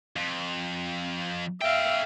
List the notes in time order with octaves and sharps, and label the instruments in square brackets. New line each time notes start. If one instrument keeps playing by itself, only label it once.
[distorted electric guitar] F2
[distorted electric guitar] A4 G5 [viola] E5 F5